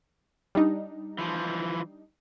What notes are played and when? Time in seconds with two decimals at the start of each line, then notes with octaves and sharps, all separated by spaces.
0.55 G3 D4 D#4
1.19 E3 F3